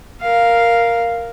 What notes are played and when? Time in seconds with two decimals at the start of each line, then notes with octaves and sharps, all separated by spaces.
0.21 A#4 F5